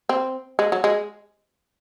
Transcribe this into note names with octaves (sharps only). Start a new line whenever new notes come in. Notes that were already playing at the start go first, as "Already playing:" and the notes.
C4
G#3
F#3
G#3